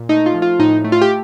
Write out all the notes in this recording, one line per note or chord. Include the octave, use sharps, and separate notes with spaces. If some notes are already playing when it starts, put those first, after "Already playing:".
Already playing: A#2
A3 D#4
F4
F3
F4
A2 D#4
A3
F4
G4